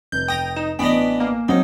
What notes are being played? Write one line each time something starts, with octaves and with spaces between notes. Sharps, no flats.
F1 G6
G5 A#5 D#6
D#4 E7
A1 B3 D4 D#5 G#5 B6
A#3
F#3 C4 D#4